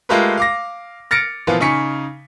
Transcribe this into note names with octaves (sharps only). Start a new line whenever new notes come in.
G#3 A3 F4 G4 A#4 B4
F5 D6 A#6
F6 A6 A#6 C#7 D7
A#2 E3 F3 B3 F4
C#3 D#4 G#5 C#6 B6 C#7